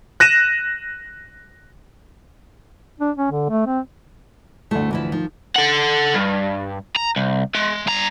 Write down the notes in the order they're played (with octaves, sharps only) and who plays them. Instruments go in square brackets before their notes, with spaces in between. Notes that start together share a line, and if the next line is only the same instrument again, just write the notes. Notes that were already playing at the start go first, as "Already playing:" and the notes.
[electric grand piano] F#6 A#6 D#7 E7
[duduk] D4
C#4
D3
A3
C4
[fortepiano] D2 A2 [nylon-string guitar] A3
[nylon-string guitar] E3 F3 E4
[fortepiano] D#3 [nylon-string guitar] F3
[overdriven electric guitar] A4 F#5
G2
A#5
C2
G#3
G2 A#5